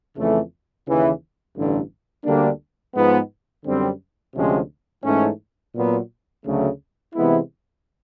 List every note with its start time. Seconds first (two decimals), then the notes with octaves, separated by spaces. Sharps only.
0.15 F2 C#3 E3 A3
0.86 D#2 C#3 E3
1.55 A1 G2 D3
2.24 D2 D3 G3 A#3 D4
2.94 G#2 F3 G#3 B3
3.64 F#2 D3 G3 C4
4.34 D2 C3 F3 G#3 C#4
5.04 G#2 E3 A3 C#4
5.74 A#2 F#3 B3
6.44 D2 C#3 F#3 A3
7.13 C3 E3 G#3 B3 E4